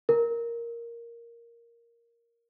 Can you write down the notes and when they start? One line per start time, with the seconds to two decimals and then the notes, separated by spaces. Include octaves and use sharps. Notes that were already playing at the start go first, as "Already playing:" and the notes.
0.09 A#4